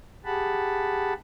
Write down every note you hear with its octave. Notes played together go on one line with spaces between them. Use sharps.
G4 G#4 F#5 A5 B5